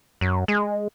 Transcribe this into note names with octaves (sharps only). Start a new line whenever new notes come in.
F#2
G#3